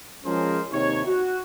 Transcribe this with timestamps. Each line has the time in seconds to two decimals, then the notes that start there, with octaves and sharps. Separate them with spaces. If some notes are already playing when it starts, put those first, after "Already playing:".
0.25 F3 G#3 C#4 G#4 A#4 C5
0.72 D#2 C3 D#4 C#5
1.06 F#4